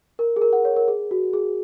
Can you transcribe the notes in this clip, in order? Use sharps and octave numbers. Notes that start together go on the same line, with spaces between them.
A#4
G#4
A#4
F#5
C#5
A#4
G#4
F#4
G#4